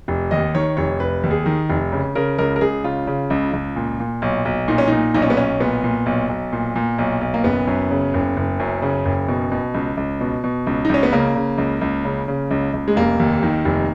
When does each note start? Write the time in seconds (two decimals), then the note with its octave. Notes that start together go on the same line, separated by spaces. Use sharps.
0.08 F1
0.31 D#2 D#5
0.55 D#3 C#5
0.77 F1 C#5
1.00 F1 B4
1.23 D#2
1.31 G#4
1.46 D#3
1.69 F1
1.92 C#3
2.15 C#3 A#4
2.38 C#2 A#4
2.56 A#4
2.61 C#2 G#4
2.84 C#3 F4
3.07 C#3
3.30 C#2
3.53 C#2
3.76 A#2
4.00 A#2
4.22 B1
4.45 B1
4.68 A#2 D#4
4.78 C#4
4.88 A#2 D#4
5.14 B1 D#4
5.22 C#4
5.30 B3
5.37 B1 C#4
5.60 A#2 B3
5.84 A#2
6.06 B1
6.29 B1
6.53 A#2
6.76 A#2
6.98 B1
7.21 B1
7.34 A#3
7.44 F#1 B3
7.67 F#2
7.91 C#3
8.14 F#1
8.37 F#1
8.60 F#2
8.82 C#3
9.05 F#1
9.28 B2
9.52 B2
9.74 C#2
9.97 C#2
10.21 B2
10.44 B2
10.67 C#2
10.85 D#4
10.89 C#2 C#4
11.03 B3
11.13 C#3 A#3
11.35 C#3
11.58 C#2
11.81 C#2
12.05 C#3
12.28 C#3
12.51 C#2
12.73 C#2
12.88 G#3
12.96 F1 A#3
13.20 D#2
13.43 D#3
13.65 F1